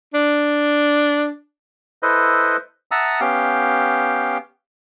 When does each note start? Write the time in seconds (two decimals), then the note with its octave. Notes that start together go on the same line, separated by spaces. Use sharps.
0.14 D4
2.02 E4 A4 B4 C5 D#5
2.91 E5 F#5 A5 A#5 D#6 E6
3.20 B3 C#4 G4 F5 G5